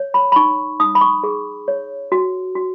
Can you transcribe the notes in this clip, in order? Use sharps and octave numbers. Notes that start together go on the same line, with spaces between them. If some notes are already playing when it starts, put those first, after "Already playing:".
Already playing: C#5
B5
B5
D#4 C#6
D#4 D#6
B5
C#6
G#4
C#5
F#4
F#4